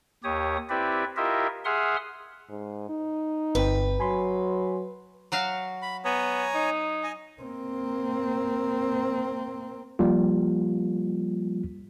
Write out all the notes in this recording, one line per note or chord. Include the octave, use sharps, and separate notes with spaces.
D#2 G4 C#5 D#6
C4 E4 G4 B4 D5 E5
E4 F4 G4 A#4 D#5 E5
G#4 E5 F#5 C6 D#6 F6
G#2
D#4
G1 C4 B4 G5
F#3 G#5 B5 C6
F#3 F#4 F5
B5
B3 C#5 G#5 A#5
D#4
D#5 G#5
A#3 C4
F3 G3 A#3 F4